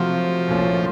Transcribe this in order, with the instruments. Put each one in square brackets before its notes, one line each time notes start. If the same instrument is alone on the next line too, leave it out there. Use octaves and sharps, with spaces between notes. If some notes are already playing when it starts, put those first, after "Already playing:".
Already playing: [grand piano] C3 F#3 A3 C4 F#4 [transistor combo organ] F3
[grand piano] C2 A#2 A3 C#4 F4